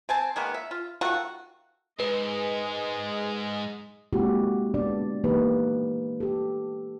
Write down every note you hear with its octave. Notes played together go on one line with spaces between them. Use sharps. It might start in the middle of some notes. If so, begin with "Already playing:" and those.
C4 G#5 A5
D#3 G#3 A#3 B3
E5
F4
D#3 A3 F4 F#4
G#2 G#3 B4 D#5
G#3 A#3 C4 E4 F#4 G4
G#3 B3 D4 D5
E3 A#3 D#4 G4 B4
G4 A4